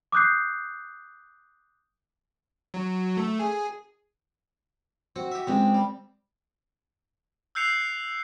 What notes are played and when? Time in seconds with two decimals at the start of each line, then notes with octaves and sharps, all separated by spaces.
0.12 D6 D#6 F#6 G6 C7
2.74 F#3
3.17 A3
3.39 G#4
5.16 C4 F#4
5.32 G4 E5
5.47 C#2 G#3 C4 G4
5.75 G3
7.55 E6 F#6 G6 C7 C#7 F7